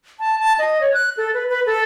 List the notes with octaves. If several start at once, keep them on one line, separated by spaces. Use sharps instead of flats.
A5
A5
D#5
C#5
F#6
A4
B4
B4
A4